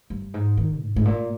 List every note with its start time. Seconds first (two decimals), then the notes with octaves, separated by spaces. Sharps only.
0.10 G2
0.34 G#2
0.57 D#3
0.81 G#2
0.96 G#2
1.05 A#2